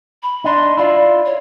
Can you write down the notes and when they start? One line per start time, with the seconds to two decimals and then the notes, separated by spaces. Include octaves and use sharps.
0.22 B5
0.44 D4 D#4 C6
0.77 E4 F4 D5
1.25 C#5